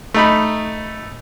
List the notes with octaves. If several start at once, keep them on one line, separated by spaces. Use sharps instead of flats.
A3 D#4 B5